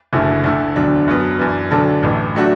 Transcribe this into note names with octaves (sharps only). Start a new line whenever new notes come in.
F#1 F#2 D3 A3 E4
D2 D3 A3 E4
E1 D2 D3 F#3 D4
F#2 F#3 B3
F#2 E3 D4
D2 D3 F#3 D4 A4
A1 A2 E3
F#3 A3 D4 F#4